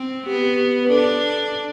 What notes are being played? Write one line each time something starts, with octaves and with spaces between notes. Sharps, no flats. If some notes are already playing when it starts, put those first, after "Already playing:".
Already playing: C4
B3 G4
G4
G4
B4
D4 A4